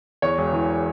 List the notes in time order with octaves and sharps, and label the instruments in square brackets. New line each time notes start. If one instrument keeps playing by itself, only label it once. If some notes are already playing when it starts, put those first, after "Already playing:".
[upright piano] E2 C#5
E1
E3